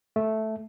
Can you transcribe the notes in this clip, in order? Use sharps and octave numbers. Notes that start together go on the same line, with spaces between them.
A3